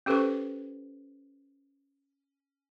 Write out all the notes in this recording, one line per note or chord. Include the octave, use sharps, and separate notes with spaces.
C#4 G4 A4 B4 C5 C#6